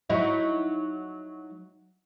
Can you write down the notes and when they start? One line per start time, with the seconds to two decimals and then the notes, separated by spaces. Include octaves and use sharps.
0.10 F#3 D#4 E4